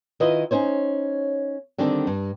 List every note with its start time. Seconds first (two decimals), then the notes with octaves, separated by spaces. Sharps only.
0.20 D#3 E4 F4 B4 D#5
0.51 C#4 D#4 C5 C#5
1.78 D3 D#3 G3 C4 D4
2.07 G2